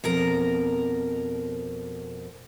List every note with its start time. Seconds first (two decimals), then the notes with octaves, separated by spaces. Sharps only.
0.04 F2 B2 A#4 A#5